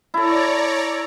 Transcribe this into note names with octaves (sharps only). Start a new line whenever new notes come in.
E4 A4 C#5 D5 A#5